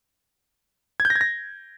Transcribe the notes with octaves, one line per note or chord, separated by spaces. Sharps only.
G#6
G6
A#6
G#6
A#6